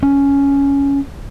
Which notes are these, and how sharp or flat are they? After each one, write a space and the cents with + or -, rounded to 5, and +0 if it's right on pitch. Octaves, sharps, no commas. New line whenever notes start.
C#4 +10